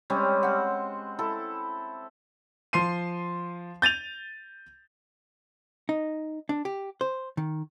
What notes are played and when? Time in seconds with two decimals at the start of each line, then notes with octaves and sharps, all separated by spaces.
0.10 G3 G#3 C4 C#4
0.43 C4 F#5
1.19 E4 A4
2.73 F3 C6 C7 D#7
3.82 G6 A6 D#7 F7
5.89 D#4
6.49 D4
6.65 G4
7.01 C5
7.37 D#3